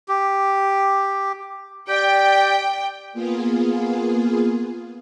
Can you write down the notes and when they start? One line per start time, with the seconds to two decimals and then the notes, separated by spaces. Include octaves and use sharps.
0.08 G4
1.89 G4 D5 G5
3.13 A#3 B3 F4 G#4